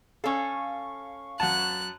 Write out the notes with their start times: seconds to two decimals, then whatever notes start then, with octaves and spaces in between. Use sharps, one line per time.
0.24 C#4 A4 F5 C#6
1.40 F#2 F#5 A5 F#6